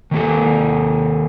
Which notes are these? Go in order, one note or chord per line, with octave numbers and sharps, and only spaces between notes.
D#3 A#3 A4